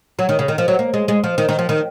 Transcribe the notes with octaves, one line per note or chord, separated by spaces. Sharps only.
F#3
D#3
C#3
D#3
F3
F#3
A#3
G#3
G#3
F3
D#3
D#3
F3
D#3